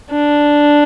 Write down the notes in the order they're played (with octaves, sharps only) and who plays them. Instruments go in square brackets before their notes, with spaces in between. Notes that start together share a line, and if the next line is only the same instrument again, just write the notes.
[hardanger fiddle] D4